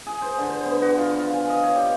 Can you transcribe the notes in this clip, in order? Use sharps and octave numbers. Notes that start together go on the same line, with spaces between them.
G#4
C5
D3
C5
B3
F#4
F4
F5
G#5
D#5
C#5
G4